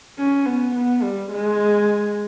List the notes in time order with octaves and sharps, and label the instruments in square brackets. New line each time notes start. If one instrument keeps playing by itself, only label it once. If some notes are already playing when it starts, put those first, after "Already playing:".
[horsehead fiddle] C#4
B3
B3
G3
G#3